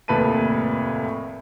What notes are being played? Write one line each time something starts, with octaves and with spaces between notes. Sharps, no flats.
F1 D#2 A2 B4 A5 D#7